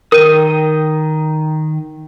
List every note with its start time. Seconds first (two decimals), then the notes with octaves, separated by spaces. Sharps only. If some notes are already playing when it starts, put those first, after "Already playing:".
0.12 D#3 A#4 G5 D#6 D#7